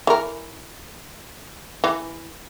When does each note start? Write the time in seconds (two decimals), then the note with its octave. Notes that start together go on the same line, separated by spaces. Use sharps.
0.07 E3 A#4
1.84 E3